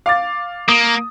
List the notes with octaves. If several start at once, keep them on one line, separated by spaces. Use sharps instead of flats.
F5 D6 A6
A#3 D#6